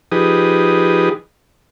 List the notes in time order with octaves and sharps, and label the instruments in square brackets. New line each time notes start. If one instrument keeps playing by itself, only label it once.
[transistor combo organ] F3 D#4 G4 G#4 B4 D#6